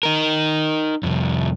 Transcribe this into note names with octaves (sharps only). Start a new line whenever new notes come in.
D#4 A#4
C2 F2